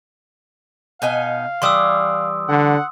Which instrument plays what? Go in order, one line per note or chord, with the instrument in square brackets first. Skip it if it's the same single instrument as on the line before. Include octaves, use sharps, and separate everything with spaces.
[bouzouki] B2 D#4 G#5 [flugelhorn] F5
[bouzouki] E3 G3 [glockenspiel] C6 D#6 E6
[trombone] D3 [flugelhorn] F#5